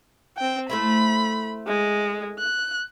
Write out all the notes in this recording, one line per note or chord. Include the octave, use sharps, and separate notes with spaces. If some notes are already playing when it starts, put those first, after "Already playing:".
C4 G5
A3 C4 E4 B5
G#3
F#6